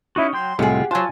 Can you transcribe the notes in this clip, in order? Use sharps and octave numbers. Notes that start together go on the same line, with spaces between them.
C#4 D#4 E4 F#4
F#3 G5 C6 G6
C2 A2 G#3 F4 G4 G#4 F#5
F#3 F4 C5 G#5 A5